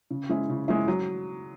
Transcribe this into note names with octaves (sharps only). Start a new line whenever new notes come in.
C#3
G#3 C#4 E4
C#3
G#3 C#4 E4
F#3